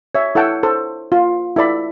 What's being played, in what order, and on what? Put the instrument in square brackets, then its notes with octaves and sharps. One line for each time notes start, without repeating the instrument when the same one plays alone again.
[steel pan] C#5 E5
E4 A4 C#5 F#5 G5 A5
A4 C5
F4
E4 A4 D5 B5